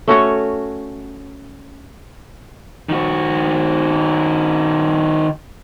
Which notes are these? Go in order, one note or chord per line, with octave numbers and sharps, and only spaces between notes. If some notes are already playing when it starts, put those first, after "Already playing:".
A3 C#4 F#4 C#5
D#3 F#4